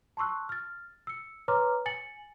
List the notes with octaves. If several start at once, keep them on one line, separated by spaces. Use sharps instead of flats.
A5 C6 C#6 E6 F#6
F6 A6
E6 C#7
B4 C#5 A#5 C6 D6 F6
G#5 A6 C#7 F#7